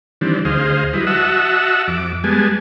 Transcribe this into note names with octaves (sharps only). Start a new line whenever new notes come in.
D#3 E3 G3 C4 D4
D2 G#4 C5 D#5 F5
F#3 G3 E4 B4 D#5
F#4 D#5 E5 F#5 A5 E6
F2 D6
G3 G#3 B3 G#5 A5